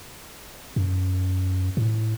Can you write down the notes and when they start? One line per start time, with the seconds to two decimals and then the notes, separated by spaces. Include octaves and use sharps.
0.76 F#2
1.77 A2